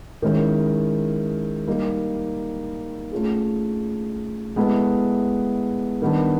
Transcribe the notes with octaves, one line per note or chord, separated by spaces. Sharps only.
D#3 G#3 C#4 E4
G3 A#3 D#4
A3 C#4 F4 G#4
G#3 B3 E4 A4
D#3 G3 B3 D4